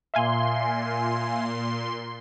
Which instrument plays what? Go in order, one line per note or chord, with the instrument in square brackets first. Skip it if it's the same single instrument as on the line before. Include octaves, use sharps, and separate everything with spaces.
[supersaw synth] A#2 C6 [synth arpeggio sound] E5 F5 G#5